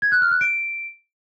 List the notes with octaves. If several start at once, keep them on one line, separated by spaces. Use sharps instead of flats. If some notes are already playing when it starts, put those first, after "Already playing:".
G#6
F#6
F6
F#6
D7